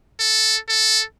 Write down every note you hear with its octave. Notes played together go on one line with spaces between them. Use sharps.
A4
A4